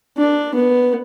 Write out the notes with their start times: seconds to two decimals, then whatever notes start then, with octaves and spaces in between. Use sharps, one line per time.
0.18 D4
0.55 B3